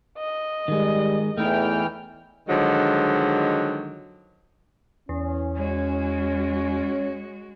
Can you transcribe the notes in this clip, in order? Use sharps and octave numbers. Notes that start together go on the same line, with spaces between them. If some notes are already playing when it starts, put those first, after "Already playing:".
D#5
D#3 G3 G#3
E2 E3 A3 D#4 E4 G5 F6
D3 D#3 F3 F#3 G#3
E2 C#4
G#3 F#4 C#5